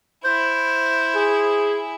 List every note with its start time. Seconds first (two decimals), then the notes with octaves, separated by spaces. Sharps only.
0.25 E4 C5
1.15 G#4